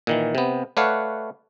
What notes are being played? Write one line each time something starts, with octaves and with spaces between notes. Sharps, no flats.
A#2 D#3 E3
C3 B3
A3 B4 C#5 D5 F5 F#5